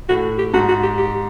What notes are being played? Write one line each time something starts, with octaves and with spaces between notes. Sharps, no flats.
A2 F#4
G4
G#2 F#4
F#4
G4
G4